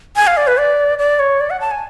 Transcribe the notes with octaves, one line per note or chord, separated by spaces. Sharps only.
G#5
F5
D5
B4
D5
D5
C#5
D5
F#5
A5
G#5